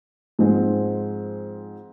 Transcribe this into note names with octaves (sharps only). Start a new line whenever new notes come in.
G#2 F3 G#3 C4